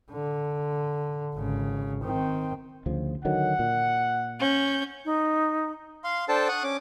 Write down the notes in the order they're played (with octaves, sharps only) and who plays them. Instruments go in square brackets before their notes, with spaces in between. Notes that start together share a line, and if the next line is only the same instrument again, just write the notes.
[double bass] D3
G#1 C#3
D#3 C4
[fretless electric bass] D2 C#3 F3
[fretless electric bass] D3 D#3 F#3 [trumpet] F#5
[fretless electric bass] A#2
[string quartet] C#4 G6
[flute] D#4
[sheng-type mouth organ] F5 C6
D4 A4 C5 G5 A5
F#5 C#6 D#6
C#4 D6